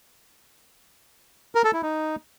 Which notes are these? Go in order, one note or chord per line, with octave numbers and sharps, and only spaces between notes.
A#4
A4
E4
D#4